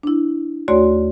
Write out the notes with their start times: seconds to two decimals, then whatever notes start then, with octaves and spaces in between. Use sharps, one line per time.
0.03 D4 E4
0.68 D#2 A3 F#4 C#5 D5 C6